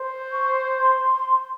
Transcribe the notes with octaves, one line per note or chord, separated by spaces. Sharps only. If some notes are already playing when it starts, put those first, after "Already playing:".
Already playing: C5
C#6
C6